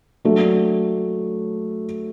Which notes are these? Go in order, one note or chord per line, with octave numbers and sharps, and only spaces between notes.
F#3 A3 D4